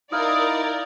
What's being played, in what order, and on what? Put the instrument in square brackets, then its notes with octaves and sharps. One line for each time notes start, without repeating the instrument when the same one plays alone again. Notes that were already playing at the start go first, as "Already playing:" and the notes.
[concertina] D#4 E4 [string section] A#4 D5 [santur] D#5 F5